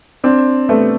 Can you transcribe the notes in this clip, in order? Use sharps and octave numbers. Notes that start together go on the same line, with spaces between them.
C4 D4
A3 B3